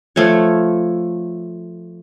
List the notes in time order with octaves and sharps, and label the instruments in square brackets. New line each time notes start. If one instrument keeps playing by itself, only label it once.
[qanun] F3 A3 C#5